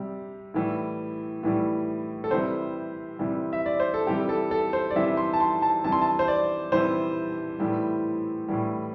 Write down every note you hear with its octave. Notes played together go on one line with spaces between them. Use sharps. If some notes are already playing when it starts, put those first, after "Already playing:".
Already playing: C3 G3
A2 E3 G3
A2 E3 G3
A4
C3 E3 G3 C5
C3 E3 G3
E5
D5
C5
A4
C3 E3 G3 G4
A4
A4
C5
D5
C3 E3 G3 E5
C6
A5
C6
A5
C3 E3 G3 A5
C6
A5
C5
D5
C3 E3 G3 C5
A2 E3 G3
A2 E3 G3